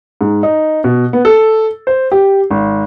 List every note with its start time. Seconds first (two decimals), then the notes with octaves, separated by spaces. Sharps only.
0.21 G#2
0.43 D#4
0.84 B2
1.13 B3
1.25 A4
1.87 C5
2.12 G4
2.50 G#1